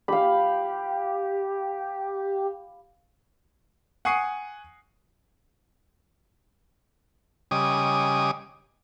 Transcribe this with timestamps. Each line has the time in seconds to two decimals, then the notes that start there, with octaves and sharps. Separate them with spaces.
0.08 G4 F5 B5
4.05 F#5 G#5 C#6 D#6 C7 D#7
7.51 C#3 G3 D#5 G#5 D6 D#6